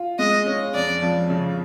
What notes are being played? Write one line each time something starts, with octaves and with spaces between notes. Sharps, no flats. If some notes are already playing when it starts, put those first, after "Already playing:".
Already playing: F4
G#3 D#5
C#4
F2 D5
F3
C#3